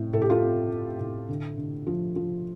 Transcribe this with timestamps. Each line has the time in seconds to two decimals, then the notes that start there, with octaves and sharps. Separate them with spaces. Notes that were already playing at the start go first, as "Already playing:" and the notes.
Already playing: A2 C4
0.13 A2 A4
0.22 G4
0.30 F4 A4
0.42 C4
0.71 C4
1.00 A2
1.29 D3
1.58 D3
1.87 F3
2.16 F3